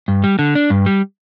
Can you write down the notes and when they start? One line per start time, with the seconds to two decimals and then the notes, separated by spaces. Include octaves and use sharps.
0.08 G2
0.24 G3
0.39 D3
0.55 D4
0.70 G2
0.86 G3